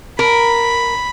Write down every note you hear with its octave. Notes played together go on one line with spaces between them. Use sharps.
A#4 B5